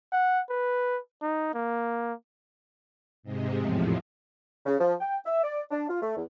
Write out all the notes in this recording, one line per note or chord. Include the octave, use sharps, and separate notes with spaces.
F#5
B4
D#4
A#3
G#2 C3 G#3
E2 A2 C3 F3
C#3
F3
G5
E5
D5
D4
F4
A3
E2